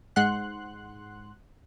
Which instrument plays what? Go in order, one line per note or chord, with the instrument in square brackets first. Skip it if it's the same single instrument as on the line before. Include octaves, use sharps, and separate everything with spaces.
[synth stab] G#2 F#5 C6 F#6